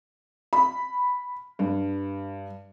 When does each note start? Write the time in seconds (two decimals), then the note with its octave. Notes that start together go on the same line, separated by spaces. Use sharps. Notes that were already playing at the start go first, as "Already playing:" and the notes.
0.53 B5
1.59 G2